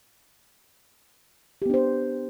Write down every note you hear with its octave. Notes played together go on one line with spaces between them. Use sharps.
B3 D4 G4 C5